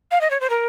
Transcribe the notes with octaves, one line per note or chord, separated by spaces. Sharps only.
F5
D#5
C#5
C5
A#4